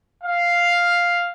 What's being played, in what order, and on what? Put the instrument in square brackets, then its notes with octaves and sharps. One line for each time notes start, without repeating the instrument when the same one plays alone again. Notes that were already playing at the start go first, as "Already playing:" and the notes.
[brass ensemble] F5